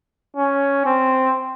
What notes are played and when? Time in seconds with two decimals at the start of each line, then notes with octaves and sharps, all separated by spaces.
0.36 C#4
0.86 C4